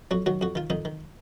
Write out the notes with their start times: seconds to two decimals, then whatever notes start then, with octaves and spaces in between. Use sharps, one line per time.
0.11 F2 F#3 F#4
0.26 D#3 F#3 F#4
0.41 F2 F#4
0.55 D#3 F4
0.70 F2 D#3 D#4
0.85 D#3